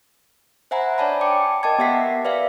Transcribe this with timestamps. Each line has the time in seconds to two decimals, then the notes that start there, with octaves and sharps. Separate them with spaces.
0.71 C5 E5 F#5 G#5 A#5 B5
0.98 D4 C#5 D5 G#5 A5 B5
1.21 G5 A5 D6 C#7
1.63 A#4 D#5 G5 A5 D6 G#6
1.78 B3 G4 E5 F#5 B6 C7
2.25 B4 D5 E5 F5